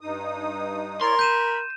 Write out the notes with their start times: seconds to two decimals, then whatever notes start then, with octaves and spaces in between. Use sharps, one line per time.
0.01 G2 D#4 D#6
1.01 E4 A#4 C#5 D5 C6
1.19 B5 G6 D#7 E7